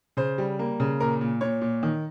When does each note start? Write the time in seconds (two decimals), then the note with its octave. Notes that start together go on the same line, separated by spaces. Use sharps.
0.17 C#3 C5
0.38 G3
0.59 A#3
0.80 C#3
1.00 A#2 A#4
1.21 A#2
1.41 A#2 C#5
1.61 A#2
1.83 D#3